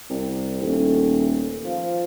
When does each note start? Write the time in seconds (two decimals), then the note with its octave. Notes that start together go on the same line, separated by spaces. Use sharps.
0.10 C2
0.62 D#1 A3
1.65 F3